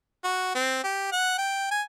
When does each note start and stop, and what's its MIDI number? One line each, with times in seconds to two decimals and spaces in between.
0.24 0.55 66
0.55 0.81 60
0.84 1.08 67
1.12 1.38 78
1.38 1.69 79
1.71 1.82 80